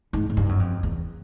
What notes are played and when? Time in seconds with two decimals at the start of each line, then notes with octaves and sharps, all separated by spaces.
0.13 G#2
0.30 G#2
0.37 G2
0.49 F#2
0.60 F2
0.83 E2